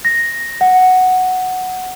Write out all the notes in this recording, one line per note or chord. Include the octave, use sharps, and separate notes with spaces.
A#6
F#5